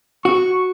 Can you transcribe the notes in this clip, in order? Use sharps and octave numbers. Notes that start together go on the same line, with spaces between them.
F#4 C#6